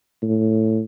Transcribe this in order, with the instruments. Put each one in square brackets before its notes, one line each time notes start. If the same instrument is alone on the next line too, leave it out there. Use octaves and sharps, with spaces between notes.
[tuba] A2